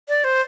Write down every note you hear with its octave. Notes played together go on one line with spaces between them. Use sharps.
D5
C5